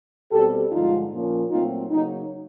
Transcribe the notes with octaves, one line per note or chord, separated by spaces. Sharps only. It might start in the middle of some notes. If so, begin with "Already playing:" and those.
B2 G3 C4 G4 A4
G2 D3 F3 G#3 D#4 F4
A#2 F3 A#3 C#4
A#2 F#3 A3 C4 D#4 F4
C#3 F#3 A#3 D#4